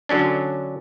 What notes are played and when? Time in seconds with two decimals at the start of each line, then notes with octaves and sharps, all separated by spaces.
0.09 D3 F#3 C#4 D4